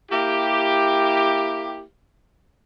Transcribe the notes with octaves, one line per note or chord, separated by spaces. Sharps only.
A#3 E4 G4